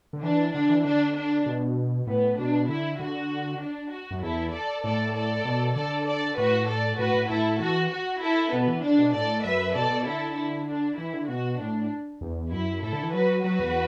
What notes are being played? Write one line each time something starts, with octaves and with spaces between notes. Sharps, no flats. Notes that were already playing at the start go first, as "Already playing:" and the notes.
D3
E3 D4
D3 D4
E3
D3 D4
D4
B2
A2 B3
B2 D4
D3 E4
D3 F#4
D4
F#4
F#2
E2 E4 A4
A4 D5
A2 A4 D5
A4 D5
B2
D3 A4 D5
A4 D5
A2 F#4 B4
A4 D5
A2 F#4 B4
A2
A2 E4 A4
E3 F#4
F#4
E4 A4
B2 B3
E3
D3 D4
B2
A2 A4 D5
F#2 B4 E5
B2 A4 D5
B2
D3 E4 A4
E4
D4
E3 E4
D3
B2 F#4
A2 D4
E2
F#2 E4
A2 E4 A4
D3
E3
F#3 F#4 B4
F#3 F#4 B4
E2